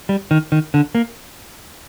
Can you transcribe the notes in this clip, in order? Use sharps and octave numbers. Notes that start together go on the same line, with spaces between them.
G3
D#3
D#3
D3
A#3